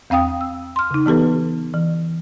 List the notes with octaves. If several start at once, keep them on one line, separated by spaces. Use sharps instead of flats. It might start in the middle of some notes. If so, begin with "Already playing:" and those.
E2 C4 F5 G5 D#6
E6
C6 F6
C#3 D#4
E3 B3 G4 A4 B4
E3